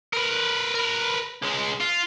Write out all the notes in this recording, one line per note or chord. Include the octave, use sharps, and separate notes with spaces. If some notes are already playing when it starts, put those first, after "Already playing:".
A#4 B4
A#4 B4
C#2 G#3
F4